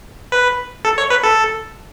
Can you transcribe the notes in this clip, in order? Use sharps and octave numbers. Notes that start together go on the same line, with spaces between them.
B4
A4
C#5
B4
A4